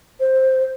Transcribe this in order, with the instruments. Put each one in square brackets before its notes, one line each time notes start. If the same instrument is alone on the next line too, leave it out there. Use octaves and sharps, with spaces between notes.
[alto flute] C5